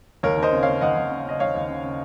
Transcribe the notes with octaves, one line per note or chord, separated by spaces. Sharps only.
D#2 A#4 C#5
D#2
C5 D#5
C#3
C#3 C#5 F5
D#2 D#5 F#5
D#2
C#3
C#3 D#5
D#2 C#5 F5
D#2
C#3
C#3